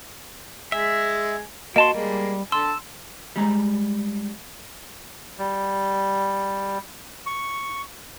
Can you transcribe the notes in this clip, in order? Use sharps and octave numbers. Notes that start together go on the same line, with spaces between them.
G#3 E5 G#5 B6
A#3 F#4 D#5 A5 C6
G3 G#3 A#3
D3 A5 C6 E6
G3 G#3 A#5
G3
C#6